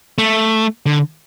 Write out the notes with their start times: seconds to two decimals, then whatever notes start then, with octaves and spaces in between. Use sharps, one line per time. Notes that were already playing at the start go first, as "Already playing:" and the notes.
0.18 A3
0.86 D3